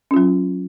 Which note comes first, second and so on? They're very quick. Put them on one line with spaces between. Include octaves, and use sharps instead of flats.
C#4 F4 F#3